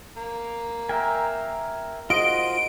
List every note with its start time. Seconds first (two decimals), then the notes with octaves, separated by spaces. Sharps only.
0.17 A#3
0.89 A#4 E5 G5 G#5
2.10 G#2 F4 F#4 C5 D#5 D7